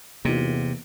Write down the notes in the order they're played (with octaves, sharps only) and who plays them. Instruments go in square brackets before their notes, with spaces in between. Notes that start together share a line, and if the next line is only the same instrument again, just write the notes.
[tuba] E2 [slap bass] C3 [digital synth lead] A#3 [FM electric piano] D#4 F4 F#4